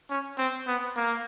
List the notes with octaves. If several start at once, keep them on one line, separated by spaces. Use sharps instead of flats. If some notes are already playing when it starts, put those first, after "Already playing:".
C#4
C4
B3
A#3